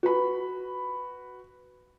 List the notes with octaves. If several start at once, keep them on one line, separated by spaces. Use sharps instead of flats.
F#4 B4 B5